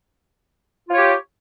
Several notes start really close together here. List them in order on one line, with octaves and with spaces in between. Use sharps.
F4 C#5 G4